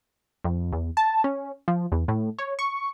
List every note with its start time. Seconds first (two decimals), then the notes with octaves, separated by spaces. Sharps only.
0.44 F2
0.73 E2
0.97 A5
1.24 C#4
1.68 F3
1.92 E2
2.08 A2
2.39 C#5
2.59 C#6